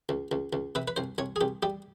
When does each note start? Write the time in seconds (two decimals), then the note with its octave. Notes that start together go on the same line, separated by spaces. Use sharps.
0.09 C#2
0.32 C#2
0.53 C#2
0.75 C3 B4
0.88 B4
0.96 C2 C5
1.18 C2 C#5
1.36 G#4
1.41 C2 G4
1.63 G3 G4